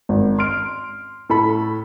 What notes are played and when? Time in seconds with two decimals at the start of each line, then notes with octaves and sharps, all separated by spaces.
0.09 G#1
0.39 C6 F6 D7
1.29 A2 A4 B5